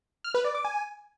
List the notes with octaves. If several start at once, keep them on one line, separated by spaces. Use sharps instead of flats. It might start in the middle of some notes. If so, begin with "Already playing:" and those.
F6
B4
D5
D6
G#5